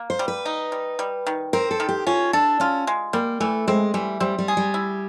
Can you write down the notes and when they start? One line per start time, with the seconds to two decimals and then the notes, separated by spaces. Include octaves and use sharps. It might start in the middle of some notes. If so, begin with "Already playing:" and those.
Already playing: A#3
0.10 C5
0.19 G3
0.28 B4
0.46 D#4
0.72 G3
0.99 G3
1.27 D#3
1.53 C4 A#4
1.71 A4
1.80 D#3
1.89 G4
2.07 C#4 F4
2.33 D4 A4
2.60 C#4 F4
2.87 G#3
3.13 G3 A#3
3.40 E3 A3
3.68 G#3 C4
3.94 E3 G3
4.20 G3 C4
4.38 G3
4.48 G#4
4.57 G3
4.74 E4